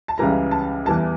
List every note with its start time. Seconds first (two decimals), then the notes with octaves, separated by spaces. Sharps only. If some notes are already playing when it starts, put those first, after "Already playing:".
0.08 A5
0.18 C#2 C#3 E3 G3 A#5
0.51 A5
0.85 E2 E3 G3 A5